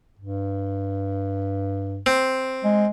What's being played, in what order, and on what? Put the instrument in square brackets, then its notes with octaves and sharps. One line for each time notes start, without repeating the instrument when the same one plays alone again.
[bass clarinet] G2
[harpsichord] C4
[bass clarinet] G#3